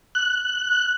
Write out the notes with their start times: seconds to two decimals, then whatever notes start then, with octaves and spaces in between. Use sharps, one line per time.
0.15 F#6